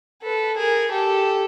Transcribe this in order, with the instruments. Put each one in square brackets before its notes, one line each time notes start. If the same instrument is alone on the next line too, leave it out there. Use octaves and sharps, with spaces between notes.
[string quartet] A4 B4
G#4 A#4
G4 A4